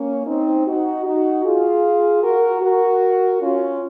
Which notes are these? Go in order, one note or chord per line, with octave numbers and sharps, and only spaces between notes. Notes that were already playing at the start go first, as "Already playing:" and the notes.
Already playing: A#3 C#4
C4 D#4
D#4 F#4
D#4 F#4
F4 G#4
F#4 A#4
F#4 A#4
C#4 F4